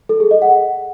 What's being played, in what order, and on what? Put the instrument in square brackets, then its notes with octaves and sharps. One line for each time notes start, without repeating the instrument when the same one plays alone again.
[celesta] A4
G#4
D#5
F#5